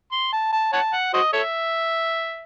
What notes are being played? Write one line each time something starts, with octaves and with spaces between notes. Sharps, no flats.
C6
A5
A5
C#5 F#5 A5
F#5
F#4 C5 D#5
A4 C#5 E5